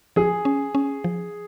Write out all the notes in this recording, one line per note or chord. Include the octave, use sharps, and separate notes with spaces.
F3 G#4
C#4
C#4
F3